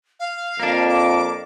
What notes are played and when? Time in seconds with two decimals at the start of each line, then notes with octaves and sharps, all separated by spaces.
0.20 F5
0.60 F2 A#3 D4
0.89 D6